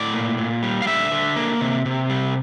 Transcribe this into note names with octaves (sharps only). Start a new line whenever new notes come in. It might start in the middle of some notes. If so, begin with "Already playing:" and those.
Already playing: A2 D5
A#2
A#2
G3
F5
D3 E5
D3
A#3
C3
C3
G3